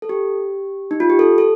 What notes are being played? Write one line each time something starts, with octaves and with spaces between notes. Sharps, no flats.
A4
G4
D#4
F4
G4
A4
A4